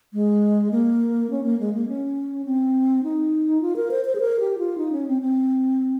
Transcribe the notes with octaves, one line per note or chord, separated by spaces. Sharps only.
G#3
A#3
C#4
A#3
G#3
A#3
C#4
C4
D#4
F4
A#4
C5
C5
G#4
A#4
G4
F4
D#4
C#4
C4
C4